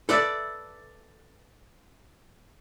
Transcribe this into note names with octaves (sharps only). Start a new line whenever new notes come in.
A4 B4 D5 E5